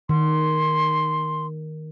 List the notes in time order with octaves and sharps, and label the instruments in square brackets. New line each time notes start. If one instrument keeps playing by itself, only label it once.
[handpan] D#3 [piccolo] C6